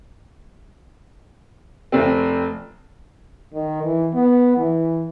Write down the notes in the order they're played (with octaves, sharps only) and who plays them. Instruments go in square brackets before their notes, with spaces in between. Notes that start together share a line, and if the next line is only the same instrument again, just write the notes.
[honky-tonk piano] F1 C4
[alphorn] D#3
E3
B3
E3